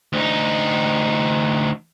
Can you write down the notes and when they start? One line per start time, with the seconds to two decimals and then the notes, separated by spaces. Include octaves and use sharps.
0.13 D2 D#4